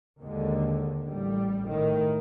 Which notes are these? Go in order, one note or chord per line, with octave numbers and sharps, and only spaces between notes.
D#2 D3 G#3
A1 G3
A2 D#3